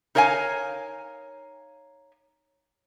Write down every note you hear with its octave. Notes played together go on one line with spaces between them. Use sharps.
D#4 A#4 C#5 F5 G#5